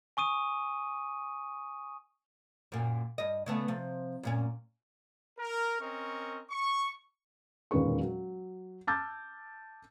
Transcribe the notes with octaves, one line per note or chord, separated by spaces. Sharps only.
G#5 C#6 D#6 D#7
F#2 A#2
G2 D#5
C#3 A3 B3
C3 F3
F#2 A#2 C#4
A#4
C4 C#4 A#4 D#5 C#6
C#6
E1 D#2 A#2 C#4 B4 C#6
F#3
A5 D6 E6 F6 G6 A6